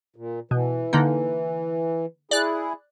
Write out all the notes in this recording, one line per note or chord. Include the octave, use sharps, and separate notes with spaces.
A#2
B2 E3
D3 A#3 D#4
E4 G#4 D5 F#6